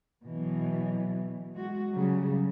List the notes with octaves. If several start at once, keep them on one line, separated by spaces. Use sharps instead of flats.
B2 E3 F#3
G#3 F#4
C#3 F#3 G3